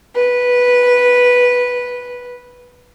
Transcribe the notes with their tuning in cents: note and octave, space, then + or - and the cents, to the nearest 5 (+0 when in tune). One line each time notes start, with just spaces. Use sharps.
B4 -10